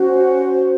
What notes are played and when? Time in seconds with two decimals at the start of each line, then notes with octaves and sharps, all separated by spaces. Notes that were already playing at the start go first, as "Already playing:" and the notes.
Already playing: C#4 F#4 C5
0.18 F#5